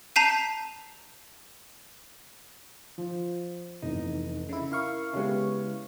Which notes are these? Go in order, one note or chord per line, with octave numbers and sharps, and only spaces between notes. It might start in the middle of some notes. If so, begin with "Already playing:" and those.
A5 A#5 G6 B6 C7 D#7
F3
F1 E2 D#4
C#3 E4
E4 A#4 F5 C#6
C#3 G#3 B3 G4 C#5